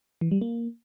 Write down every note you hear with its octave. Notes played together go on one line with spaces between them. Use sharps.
E3
G3
A#3